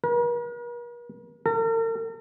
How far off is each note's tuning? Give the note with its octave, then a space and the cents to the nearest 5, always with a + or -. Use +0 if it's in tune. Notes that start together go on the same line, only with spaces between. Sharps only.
A#4 +45
A#4 -45